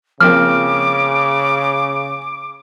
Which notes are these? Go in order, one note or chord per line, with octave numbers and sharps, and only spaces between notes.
C#3 F3 A#3 C4 D6 F6